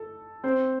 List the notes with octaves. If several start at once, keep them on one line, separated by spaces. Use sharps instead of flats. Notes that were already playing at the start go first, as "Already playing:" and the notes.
Already playing: A4
C4 C5